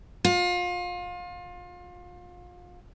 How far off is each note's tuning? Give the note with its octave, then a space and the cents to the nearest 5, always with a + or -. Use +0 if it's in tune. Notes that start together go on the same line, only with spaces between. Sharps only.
F4 +30